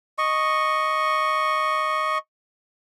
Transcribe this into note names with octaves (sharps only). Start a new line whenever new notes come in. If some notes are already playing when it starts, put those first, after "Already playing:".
D#5 C#6